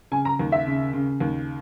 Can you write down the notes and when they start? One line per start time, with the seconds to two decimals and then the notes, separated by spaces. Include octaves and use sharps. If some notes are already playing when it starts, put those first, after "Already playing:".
0.12 C#3 G#5
0.25 A#5
0.39 D#2
0.52 E5
0.67 C#3
0.93 C#3
1.20 D#2